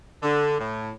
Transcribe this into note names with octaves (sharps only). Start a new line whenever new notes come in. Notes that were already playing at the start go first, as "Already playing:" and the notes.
D3
A2